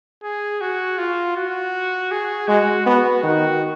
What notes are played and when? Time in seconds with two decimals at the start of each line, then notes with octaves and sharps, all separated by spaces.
0.24 G#4
0.61 F#4
0.98 F4
1.36 F#4
2.11 G#4
2.48 G#3 F#4
2.86 B3 F#4
3.23 D#3 F#4